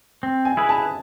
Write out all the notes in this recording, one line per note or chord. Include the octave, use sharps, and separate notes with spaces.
C4
G#5
E4 G#4 B4
A5